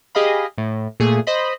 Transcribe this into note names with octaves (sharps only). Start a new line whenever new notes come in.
G4 G#4 D#5 F5 B5
A2
A#2 A3 G#4
C5 D#5 B5